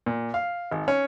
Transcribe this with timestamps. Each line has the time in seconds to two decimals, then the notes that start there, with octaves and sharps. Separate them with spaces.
0.06 A#2
0.34 F5
0.72 G#1
0.88 C#4